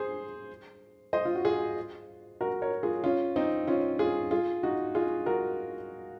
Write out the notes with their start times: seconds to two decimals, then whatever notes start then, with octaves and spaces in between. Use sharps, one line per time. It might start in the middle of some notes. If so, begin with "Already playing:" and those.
Already playing: G#4 C5
1.13 C5 D#5
1.25 F4
1.35 F#4
1.45 F4 G#4
2.41 F#4 A#4
2.62 A#4 C#5
2.83 F4 G#4
3.04 C#4 F4
3.36 C4 D#4
3.67 C#4 F4
3.99 F4 G#4
4.31 F4 G#4
4.63 D#4 F#4
4.95 F4 G#4
5.26 F#4 A#4